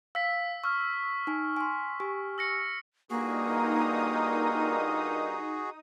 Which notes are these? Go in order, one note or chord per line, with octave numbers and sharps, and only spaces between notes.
F5 E6 B6
C#6 E6 F6
D#4 G#5
G#5 C6
G4 G#5
E6 A#6 C#7
G2 A#2 A#3 D#4 F#4 G#4 A#4 D#6